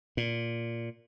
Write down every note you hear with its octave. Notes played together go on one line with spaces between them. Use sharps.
A#2